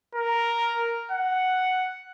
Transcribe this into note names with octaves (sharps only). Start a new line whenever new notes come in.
A#4
F#5